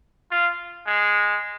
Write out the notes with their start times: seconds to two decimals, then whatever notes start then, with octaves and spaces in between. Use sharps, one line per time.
0.31 F4
0.86 G#3